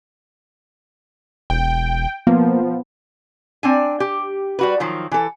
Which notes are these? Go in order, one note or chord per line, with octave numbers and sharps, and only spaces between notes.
E1 G5
F3 A#3 B3
C4 D4 G#5
G4
G3 F#4 B4
D#3 F3 F#3
E3 A4